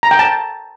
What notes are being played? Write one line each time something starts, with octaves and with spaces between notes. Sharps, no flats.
A#5
G5
A5